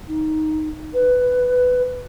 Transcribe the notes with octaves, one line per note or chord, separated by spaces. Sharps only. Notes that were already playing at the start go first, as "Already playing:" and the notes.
D#4
B4